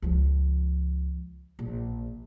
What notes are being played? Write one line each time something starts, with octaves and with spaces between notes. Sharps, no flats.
C#2 F3
A#1